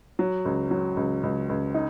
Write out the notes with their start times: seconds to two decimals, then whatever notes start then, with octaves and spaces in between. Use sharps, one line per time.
0.19 F#3
0.45 C#2
0.71 F#3
0.97 C#2
1.23 C#2
1.49 C#2
1.74 D#4